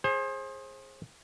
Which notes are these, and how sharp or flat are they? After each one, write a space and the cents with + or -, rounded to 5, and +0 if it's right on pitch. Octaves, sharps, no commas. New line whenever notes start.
G#4 +0 C5 +30